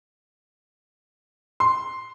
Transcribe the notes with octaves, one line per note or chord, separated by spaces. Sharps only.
C6